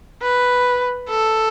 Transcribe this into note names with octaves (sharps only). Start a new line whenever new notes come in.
B4
A4